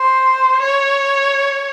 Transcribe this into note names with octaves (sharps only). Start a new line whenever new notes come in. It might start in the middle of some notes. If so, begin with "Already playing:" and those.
Already playing: C5
C#5